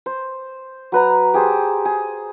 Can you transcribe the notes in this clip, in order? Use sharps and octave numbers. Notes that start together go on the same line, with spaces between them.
C5
F#3 B4 A#5
G4 G#4 C5
G#4